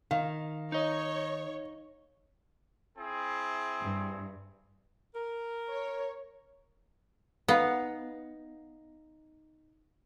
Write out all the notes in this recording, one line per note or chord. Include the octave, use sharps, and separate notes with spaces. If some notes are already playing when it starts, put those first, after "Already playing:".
D#3 F5
D#4 C#5 D#5
C4 E4 G#4
G2
A#4
C#5
B3 D#4 F5 F#5